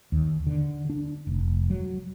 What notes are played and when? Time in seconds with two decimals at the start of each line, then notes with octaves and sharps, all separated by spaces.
0.12 D#2
0.47 D3
0.90 D4
1.27 F1
1.70 F#3